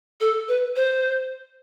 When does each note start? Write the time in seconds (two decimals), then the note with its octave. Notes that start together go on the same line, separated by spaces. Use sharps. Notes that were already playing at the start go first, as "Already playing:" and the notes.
0.21 A4
0.48 B4
0.76 C5